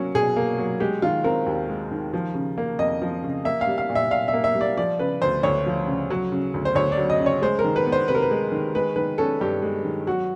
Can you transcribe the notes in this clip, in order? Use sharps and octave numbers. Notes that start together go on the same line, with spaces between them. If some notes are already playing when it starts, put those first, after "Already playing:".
Already playing: F#3 A#3 C#4
B2 G#4
A#3
F#3
G#3 G4
D#3 F4
C4 A#4
D#2
G#3
D#3
F3
C#3
A#3
F2 D#5
F3
C#3
A#3 E5
F5
G3
F5
A#2
E5
A#2 F5
E5
A#3
E5
G3
D5
F3 D5
C#3 B4
D2 C5
D2 C#5
F3
C#3
F#3
C#3
D2
C5
D2 C#5
D5
F#3
D#5
C#3
C#5
G#3 C5
A#4
D#3
B4
B3
C5
C3 B4
A#4
B4
G#3
D#3
G#3 B4
D#3 B4
C#4 A4
G2 G4
G#3
D#3
F#3 F#4